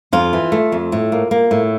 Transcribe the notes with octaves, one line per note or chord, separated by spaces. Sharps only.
F2 F4
E3
A3
F2
A2
A#3
A#3
A2